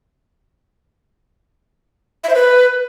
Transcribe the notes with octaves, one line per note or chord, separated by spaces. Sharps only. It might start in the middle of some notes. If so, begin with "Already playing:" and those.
E5
C5
B4